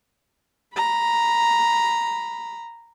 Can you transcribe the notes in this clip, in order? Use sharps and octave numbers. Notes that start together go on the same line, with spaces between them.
A#5 B5